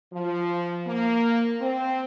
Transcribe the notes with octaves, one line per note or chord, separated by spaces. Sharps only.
F3
A#3
C4